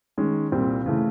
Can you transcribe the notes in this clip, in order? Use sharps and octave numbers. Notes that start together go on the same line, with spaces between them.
D#3 G#3 C#4
C2 A#2 G3 C4
C#3 E3 A3